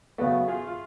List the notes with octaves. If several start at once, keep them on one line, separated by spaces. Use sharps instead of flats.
C#3 F#3 A3 B3 F#4 B4
F4 G#4
F4